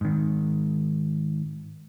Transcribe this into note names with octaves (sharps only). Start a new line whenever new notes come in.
G#2 D#3